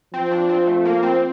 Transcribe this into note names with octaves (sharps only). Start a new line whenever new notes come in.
F3 C4
D4
C4
A3
A#3
C4